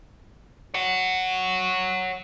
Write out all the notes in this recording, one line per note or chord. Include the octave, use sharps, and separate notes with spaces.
C#5 F#5